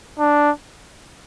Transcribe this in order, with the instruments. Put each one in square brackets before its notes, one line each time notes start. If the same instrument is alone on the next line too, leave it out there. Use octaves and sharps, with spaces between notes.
[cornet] D4